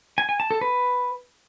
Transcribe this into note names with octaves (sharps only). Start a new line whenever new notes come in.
G#5
G#5
A5
A4
B4